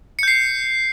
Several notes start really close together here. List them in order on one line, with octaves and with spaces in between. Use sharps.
C#7 G6 C7